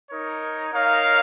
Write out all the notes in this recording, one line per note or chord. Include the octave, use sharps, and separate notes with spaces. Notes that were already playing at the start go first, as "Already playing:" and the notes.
D#4 A#4 C#5
D#4 A#4 C#5 F5